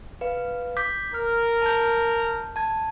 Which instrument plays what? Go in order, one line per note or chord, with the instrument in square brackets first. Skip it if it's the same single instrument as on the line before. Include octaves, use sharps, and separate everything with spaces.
[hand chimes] B4 F5
D6 G6 B6
[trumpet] A#4 [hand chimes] F6
[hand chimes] A5 G6
A5 G#6